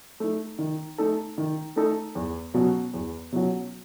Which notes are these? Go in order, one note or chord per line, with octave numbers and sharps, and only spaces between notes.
A3 D#4
D#3
A3 D#4 A4
D#3
A3 D#4 A4
E2
B2 F#3 C#4 F#4
E2
B2 F#3 C#4 F#4